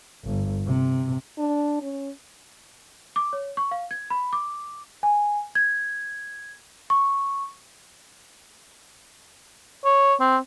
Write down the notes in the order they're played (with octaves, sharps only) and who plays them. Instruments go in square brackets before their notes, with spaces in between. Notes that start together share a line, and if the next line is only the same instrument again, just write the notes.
[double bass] G1
C3
[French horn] D4
C#4
[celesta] D6
C#5
C#6
F5
G#6
B5
D6
G#5
G#6
C#6
[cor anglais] C#5
C4